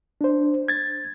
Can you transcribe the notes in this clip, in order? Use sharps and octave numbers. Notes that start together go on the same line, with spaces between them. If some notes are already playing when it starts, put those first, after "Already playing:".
D4 C5
G#6 A6